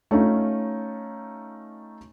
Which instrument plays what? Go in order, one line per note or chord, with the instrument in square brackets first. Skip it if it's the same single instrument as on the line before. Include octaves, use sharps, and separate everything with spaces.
[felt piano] A3 C#4 D#4 F4